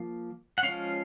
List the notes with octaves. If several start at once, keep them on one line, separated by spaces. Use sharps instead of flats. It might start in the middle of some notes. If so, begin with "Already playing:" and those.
Already playing: F3 A#3
F#5
F3 G#3 C#4 F5